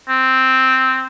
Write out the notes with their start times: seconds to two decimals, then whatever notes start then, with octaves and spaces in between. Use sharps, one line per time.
0.09 C4